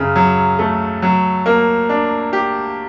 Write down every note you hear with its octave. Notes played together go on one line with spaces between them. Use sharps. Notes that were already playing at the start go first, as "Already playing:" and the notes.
Already playing: F#2 C#3
F#3
A3
F#3
A#3
D4
G4